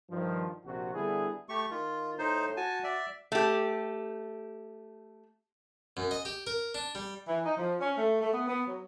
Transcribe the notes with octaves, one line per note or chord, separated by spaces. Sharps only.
G2 D#3 F3
A#1 C3 F#4
D3 G3 B3 E4 G#4
A3 G4 C#6
D#3 F4
A2 D#4 C5
F#4 G#5 A5
D5 E5
A3 G4
F#2
D#5
G4
A#4
D4
G3
E3
D#4
F3
C#4
A3
A3
B3
B3
F#3